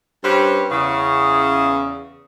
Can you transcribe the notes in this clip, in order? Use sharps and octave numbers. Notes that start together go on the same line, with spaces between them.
G2 C#4 G4 B4 C5
E2 C#3